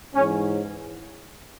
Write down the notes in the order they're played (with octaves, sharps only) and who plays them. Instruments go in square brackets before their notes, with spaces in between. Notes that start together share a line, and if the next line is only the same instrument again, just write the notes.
[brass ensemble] G#2 E3 C#4